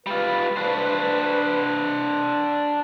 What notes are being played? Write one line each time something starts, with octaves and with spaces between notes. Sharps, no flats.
G3 F4 B4
D4 C5